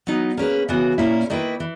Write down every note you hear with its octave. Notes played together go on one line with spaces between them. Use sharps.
F#3 B3 D#4
A#3 C#4 G#4 B4
C#3 E3 B3 F#4
A#2 A#3 C#4 E4
D#3 A#3 E4 B4
E3